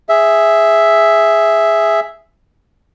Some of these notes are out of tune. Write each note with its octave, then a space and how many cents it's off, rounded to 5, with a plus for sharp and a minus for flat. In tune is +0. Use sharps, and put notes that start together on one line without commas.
G#4 +0 E5 +0